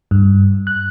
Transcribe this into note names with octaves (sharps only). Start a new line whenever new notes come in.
G2
F#6